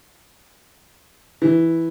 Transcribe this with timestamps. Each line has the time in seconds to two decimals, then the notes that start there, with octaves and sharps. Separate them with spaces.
1.42 E3